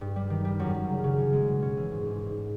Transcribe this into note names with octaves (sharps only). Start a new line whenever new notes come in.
G2
G3
D#3
G3
F#2
F#2
C#3
C#3
C#4
G#3
B2
C#4
E3
G#2
G#2
G#2